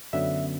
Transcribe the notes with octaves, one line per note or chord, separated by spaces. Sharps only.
F#2 D3 F#3 B3 E5